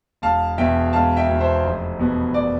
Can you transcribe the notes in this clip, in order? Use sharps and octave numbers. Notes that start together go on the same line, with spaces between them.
E1 F5 A5
E2 B2 E5 G5
E1 F5 A5
E5 G5
E2 B2
C5 E5
F1
E2 B2 B3
F1 D5